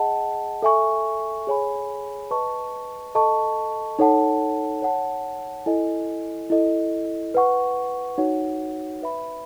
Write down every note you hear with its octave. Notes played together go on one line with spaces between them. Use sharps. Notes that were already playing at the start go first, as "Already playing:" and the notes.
Already playing: G#4 D#5 F#5 A5
A4 E5 G#5 C#6
G#4 C#5 G#5 B5
B4 D#5 A5 C#6
A4 D#5 A5 C#6
D#4 A4 C#5 F#5 A5
C#5 F#5 A5
E4 A4 D#5 G#5
E4 A4 D#5
B4 F#5 C#6
D#4 F#4 C#5 F#5
B4 E5 B5